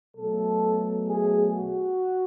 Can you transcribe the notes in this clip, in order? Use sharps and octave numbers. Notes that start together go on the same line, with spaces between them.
B2 F#3 A3 A4
G#4
F#4